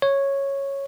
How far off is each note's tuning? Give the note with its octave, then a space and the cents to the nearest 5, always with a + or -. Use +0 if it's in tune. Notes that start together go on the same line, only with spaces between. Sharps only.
C#5 -5